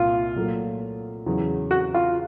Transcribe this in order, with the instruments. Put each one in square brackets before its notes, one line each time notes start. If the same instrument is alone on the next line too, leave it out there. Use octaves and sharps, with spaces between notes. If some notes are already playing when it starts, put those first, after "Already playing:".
Already playing: [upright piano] C2 A#2 [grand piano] F4
[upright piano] A#2 F#3 A3
E2 C#3 F#3
[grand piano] F#4
F4